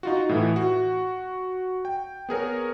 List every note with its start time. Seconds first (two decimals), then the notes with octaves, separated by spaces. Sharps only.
0.03 D#4 F4 F#4
0.29 A2 E3 E4
0.56 F#4
1.85 G5
2.29 B3 G#4 A#4 C#5